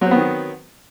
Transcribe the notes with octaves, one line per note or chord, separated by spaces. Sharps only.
D#3 F#3 B3 C4